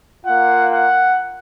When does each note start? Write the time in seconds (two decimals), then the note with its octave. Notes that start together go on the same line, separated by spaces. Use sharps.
0.25 A#3 F4 F#5
0.71 F#5